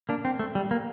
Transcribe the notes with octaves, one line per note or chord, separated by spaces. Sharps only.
A#3 D4
C4
A3
G3
A#3